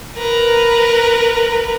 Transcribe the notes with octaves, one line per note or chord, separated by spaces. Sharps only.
A#4 B4